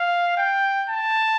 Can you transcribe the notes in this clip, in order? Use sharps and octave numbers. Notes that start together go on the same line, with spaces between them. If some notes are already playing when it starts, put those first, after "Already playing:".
Already playing: F5
G5
A5